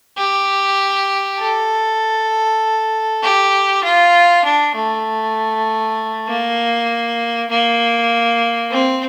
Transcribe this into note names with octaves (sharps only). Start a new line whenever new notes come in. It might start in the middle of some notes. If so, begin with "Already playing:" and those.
G4
A4
G4
F4
D4
A3
A#3
A#3
C4